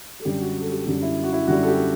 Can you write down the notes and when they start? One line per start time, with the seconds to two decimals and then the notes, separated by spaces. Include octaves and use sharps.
0.20 A4
0.25 F#2 D3 G3 G4
0.40 F#4
0.61 A4
0.71 G4
0.86 F#2 D3 G3 F#4
1.02 E4
1.24 F#4
1.33 E4
1.47 F#2 D3 G3 F#4
1.63 A4
1.68 G4